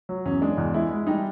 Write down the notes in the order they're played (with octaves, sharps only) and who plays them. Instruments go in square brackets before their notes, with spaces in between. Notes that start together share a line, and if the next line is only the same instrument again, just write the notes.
[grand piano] F#3
[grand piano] E2 [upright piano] C#4
[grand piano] G#3 [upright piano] D4
[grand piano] E2
[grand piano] G#3 [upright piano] E4
[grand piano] G#3
[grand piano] G3 [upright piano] D#4